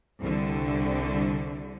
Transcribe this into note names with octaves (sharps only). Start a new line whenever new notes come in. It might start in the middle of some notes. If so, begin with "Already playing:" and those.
C2 D3